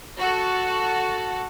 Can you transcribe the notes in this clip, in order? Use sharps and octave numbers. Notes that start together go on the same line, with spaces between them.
F#4 A4